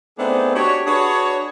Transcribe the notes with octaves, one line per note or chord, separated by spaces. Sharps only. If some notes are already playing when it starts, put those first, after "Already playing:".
A3 B3 C4 D4 D#4 G#4
D4 F#4 G4 C#5
D4 F#4 G#4 B4 C#5